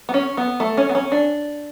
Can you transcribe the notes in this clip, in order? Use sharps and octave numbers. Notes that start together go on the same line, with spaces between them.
B3
C#4
B3
A3
C#4
B3
C#4
D4